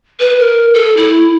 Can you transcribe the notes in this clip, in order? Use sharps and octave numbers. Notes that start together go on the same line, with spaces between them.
B4
A#4
A4
E4